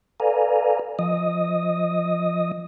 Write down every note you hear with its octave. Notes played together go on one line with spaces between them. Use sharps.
A4 B4 D5 F5 G#5 A#5
F3 D#5 D#6